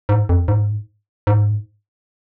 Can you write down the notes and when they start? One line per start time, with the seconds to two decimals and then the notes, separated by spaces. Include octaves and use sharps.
0.09 G#2
0.29 F2
0.48 G#2
1.27 G#2